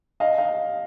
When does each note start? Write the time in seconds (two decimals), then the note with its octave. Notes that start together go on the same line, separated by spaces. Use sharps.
0.20 D#5 F5
0.38 D#5 F5